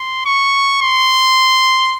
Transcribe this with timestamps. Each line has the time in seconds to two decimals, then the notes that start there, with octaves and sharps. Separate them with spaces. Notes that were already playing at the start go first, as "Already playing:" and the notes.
Already playing: C6
0.26 C#6
0.82 C6